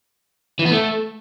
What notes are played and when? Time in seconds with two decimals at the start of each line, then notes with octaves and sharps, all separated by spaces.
0.59 E3
0.65 B3
0.71 A3